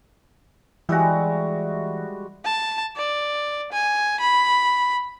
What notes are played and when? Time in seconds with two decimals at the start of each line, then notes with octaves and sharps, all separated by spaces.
0.89 E3 G3 G#3 F#4 E5
2.45 A5
2.96 D5
3.72 G#5
4.20 B5